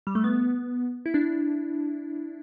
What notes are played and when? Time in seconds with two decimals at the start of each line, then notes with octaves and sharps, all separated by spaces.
0.07 G3
0.15 A3
0.24 B3
1.06 E4
1.14 D4